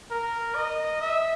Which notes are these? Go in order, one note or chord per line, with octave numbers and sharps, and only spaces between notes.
A#4
D#5
E5